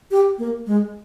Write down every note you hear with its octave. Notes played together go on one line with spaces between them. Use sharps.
G4
A#3
G#3